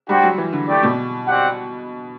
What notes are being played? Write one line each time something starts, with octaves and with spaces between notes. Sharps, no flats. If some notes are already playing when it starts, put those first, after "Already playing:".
G3 D4 F#4 C5 G5
F#3
E3
D3
A3 E4 G4 D5 G5
B2
C4 G4 D5 F#5